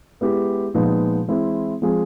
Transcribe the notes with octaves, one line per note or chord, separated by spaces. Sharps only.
G#3 B3 E4 G4
A#2 F3 G#3 B3 D#4
E3 G#3 C4 E4
F3 G#3 C4 F4 G#4